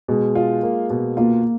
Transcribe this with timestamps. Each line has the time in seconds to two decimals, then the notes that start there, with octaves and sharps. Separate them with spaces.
0.08 B2 G#3
0.35 F4
0.63 A#3
0.90 B2
1.17 A#3 F4